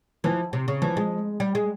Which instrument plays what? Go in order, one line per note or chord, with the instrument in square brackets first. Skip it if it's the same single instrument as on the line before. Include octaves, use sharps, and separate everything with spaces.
[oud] E3 [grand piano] F3
[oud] C3
C#3
[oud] E3 [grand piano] F3
[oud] G#3
G3
G#3